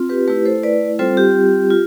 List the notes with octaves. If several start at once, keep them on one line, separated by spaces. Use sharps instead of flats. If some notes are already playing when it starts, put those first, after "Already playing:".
Already playing: C4 F4
G4 B4
A3 E4 G4 B4
A4 C5
B4 D5
G3 C4 F4 A4 C5
G4
F4